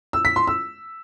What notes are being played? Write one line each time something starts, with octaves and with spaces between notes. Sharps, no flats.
E6
B6
C6
E6